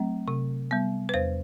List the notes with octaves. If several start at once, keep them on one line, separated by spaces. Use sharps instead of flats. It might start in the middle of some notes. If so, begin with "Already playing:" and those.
Already playing: F#3 A3 C4
C3
G3 B3
B4
E2 C5